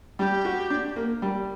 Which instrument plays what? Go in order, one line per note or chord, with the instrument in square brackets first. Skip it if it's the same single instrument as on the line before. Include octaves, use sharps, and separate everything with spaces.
[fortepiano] G3 [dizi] G4
[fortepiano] F#4
D4
A#3
G3